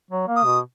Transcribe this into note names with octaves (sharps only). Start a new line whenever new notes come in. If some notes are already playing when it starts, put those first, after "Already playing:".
F#3
A#3
D#6
B2